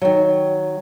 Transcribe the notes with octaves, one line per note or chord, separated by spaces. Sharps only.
D#3 F#3